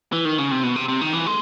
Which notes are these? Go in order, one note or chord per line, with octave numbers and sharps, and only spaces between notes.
E3
D#3
C#3
C3
B2
C3
C3
D#3
E3
G#3